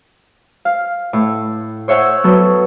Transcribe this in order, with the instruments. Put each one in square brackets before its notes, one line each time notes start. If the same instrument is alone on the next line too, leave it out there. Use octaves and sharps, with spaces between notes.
[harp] F5
A2
C5 C#5 E5 F#5 G#5
F#3 B3 A4